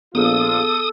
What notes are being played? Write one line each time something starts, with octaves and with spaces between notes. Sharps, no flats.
A#1 B3 F4 G#4 A4 F5 D#6